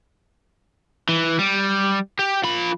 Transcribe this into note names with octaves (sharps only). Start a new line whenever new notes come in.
E3
G3
G4
F3 B5